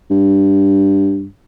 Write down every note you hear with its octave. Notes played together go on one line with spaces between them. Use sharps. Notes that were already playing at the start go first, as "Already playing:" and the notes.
G2